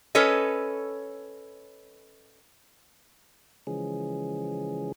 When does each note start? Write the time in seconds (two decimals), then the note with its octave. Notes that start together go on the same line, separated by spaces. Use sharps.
0.15 C#4 A4 B4 C#5 D#5
3.67 C#3 E3 F3 G#3 C#4 G#4